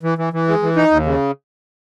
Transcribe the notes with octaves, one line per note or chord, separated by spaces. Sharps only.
E3
E3
E3
G#3
E3
D#4
D#2
C#3